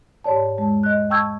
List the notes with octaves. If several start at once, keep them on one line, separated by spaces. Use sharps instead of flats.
G#2 G4 C#5 D5 A5
E2 G#3 A5
D#5 F#6
G5 A5 C#6 E6 G6 G#6